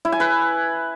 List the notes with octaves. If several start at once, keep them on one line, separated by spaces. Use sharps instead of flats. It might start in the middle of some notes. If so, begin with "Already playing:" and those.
E4
G#5
B4